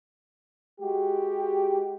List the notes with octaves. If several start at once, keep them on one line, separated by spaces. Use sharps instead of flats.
G#3 F#4 G4